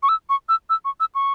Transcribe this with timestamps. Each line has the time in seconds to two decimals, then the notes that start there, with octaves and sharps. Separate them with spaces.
0.03 C#6
0.09 E6
0.29 C#6
0.49 E6
0.70 E6
0.85 C#6
1.00 E6
1.15 C#6